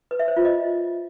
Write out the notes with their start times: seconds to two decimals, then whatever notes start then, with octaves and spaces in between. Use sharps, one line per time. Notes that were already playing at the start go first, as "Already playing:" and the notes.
0.11 B4
0.20 E5
0.28 C5
0.37 F4
0.45 D#5